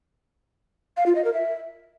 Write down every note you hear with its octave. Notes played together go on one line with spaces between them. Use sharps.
F5
F4
D#5
A#4
E5